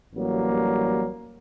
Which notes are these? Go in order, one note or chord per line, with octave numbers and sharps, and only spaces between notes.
A1 F#3 G3 A#3